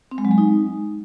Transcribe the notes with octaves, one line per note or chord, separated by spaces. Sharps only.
C4
G#3
F#3
G#3
D#4